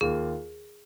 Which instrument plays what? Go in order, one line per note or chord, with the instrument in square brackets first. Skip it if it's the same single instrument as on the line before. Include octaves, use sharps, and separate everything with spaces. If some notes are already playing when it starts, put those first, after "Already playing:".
[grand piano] D#2 D#3 A#3 F4 [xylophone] G#4